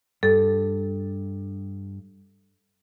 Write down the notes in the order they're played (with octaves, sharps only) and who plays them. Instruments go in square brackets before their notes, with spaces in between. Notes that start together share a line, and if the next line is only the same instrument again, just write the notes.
[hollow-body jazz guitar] G2 [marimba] A4